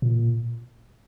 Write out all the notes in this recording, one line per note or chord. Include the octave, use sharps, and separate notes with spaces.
A#2